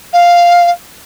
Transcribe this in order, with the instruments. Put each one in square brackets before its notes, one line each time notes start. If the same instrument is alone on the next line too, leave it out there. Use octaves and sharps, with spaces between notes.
[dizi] F5